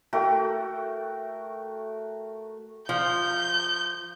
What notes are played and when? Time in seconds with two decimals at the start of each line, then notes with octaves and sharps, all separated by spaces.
0.13 A3 F#4 A#4 G5
2.89 F3 G6